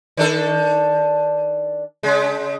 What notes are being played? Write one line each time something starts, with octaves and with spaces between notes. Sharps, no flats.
D#3 D4 A4
C#3 G#3